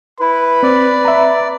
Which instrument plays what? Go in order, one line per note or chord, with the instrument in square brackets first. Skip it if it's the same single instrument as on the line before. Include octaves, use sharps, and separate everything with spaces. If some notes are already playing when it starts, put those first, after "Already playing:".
[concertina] E4 [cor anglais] B4 [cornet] B5
[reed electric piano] C4 [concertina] D5
[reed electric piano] E5 A#5